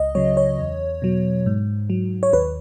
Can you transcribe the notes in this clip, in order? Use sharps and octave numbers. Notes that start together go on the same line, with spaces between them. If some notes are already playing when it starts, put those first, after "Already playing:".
Already playing: C#2 D#5
C#3 F#3 C#5
C#5
E2
B2 F#3
G#2
F#3
C#5
D#2 B4